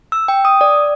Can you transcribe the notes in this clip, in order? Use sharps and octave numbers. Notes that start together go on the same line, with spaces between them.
E6
G5
D#6
D5